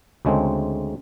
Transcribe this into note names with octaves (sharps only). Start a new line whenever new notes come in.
D2 C#3 G#3 A3 C4